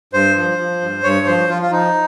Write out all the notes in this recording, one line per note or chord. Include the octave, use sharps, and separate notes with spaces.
G2 C5
F3
F3
G2
G2 C#5
F3 C5
F3 F4
F4
F3 D#4